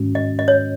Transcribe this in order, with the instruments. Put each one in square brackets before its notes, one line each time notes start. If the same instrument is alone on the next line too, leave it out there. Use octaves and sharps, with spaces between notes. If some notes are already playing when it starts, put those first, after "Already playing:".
Already playing: [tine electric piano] G#2 D#3 G#3 C#4 F#4
[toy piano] D#5
D#5
C#5